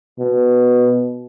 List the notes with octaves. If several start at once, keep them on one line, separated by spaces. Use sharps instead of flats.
B2